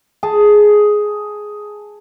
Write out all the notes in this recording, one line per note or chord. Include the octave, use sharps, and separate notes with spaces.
G#4 A5